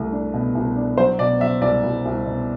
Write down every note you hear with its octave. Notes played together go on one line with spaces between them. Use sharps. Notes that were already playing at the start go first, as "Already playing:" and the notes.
Already playing: C2 A3
D4
B2
C2
D4
F#3 C5
B2 D5
F#3 E5
C2 D5
C2
C2
B2